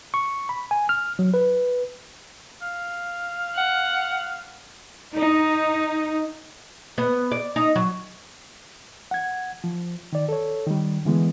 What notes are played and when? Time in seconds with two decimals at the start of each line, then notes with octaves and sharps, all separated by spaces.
0.14 C#6
0.49 B5
0.71 G#5
0.89 F6
1.19 F#3
1.34 B4
2.62 F5
3.55 F#5
5.15 D#4
6.98 B3
7.32 D5
7.56 D#4
7.75 F#3
9.11 F#5 G#6
9.64 F3
10.13 D#3 D5
10.29 A4 C#5
10.67 D#3 G3
11.05 D3 E3 G#3 B3